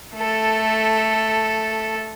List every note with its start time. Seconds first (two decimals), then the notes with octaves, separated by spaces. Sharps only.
0.15 A3 A4